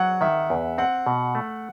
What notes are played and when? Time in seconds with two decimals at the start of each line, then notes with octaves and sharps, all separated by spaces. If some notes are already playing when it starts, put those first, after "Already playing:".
Already playing: F#3 F#5
0.21 D#3 E5
0.50 E2
0.78 C4 F#5
1.07 B2
1.35 A3